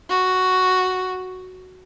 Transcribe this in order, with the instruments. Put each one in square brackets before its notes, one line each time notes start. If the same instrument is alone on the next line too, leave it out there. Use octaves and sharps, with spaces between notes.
[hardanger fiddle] F#4